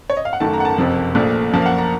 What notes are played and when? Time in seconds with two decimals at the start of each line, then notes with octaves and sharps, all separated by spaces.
0.10 C#5
0.17 D#5
0.25 F5
0.33 F#5
0.40 F#1 F#2 D#3 A3 A5
0.53 A#5
0.60 F#5
0.65 A5
0.78 F#1 F2 C3 F3
1.15 A#1 A#2 F3 A3
1.53 F#2 F3 A#3 A5
1.62 F5
1.66 F#5
1.78 A#5